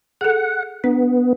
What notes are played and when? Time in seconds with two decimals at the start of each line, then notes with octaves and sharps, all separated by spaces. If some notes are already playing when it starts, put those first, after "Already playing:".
0.21 G#4 A4 F#5
0.84 B3 D4